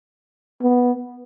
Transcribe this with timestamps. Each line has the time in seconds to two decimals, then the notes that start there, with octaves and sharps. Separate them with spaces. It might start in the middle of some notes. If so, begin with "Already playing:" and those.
0.62 B3